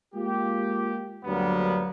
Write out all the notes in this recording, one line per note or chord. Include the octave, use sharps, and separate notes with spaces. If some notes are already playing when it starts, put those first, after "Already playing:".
G#3 A#3 F4 G4
D2 G2 F#3 G3 A#3 B3